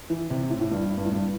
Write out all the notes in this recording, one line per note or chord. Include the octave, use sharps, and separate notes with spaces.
E3
C3
A2
A2
G2
G2
A2
G2